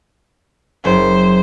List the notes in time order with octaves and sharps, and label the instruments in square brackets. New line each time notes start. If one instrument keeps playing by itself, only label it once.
[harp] F#1 [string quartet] C5